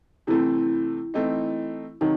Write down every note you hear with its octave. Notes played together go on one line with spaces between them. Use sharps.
C3 E3 A3 C4 E4
E3 A3 C4 D#4
C3 D#3 F#3 D#4